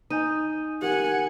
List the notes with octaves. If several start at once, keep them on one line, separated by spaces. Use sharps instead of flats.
D#4 G#5 G6 D#7
G4 A#4 F#5 G#5